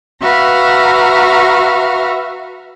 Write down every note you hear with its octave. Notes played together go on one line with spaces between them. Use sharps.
F#4 B4 E5 F5 A#5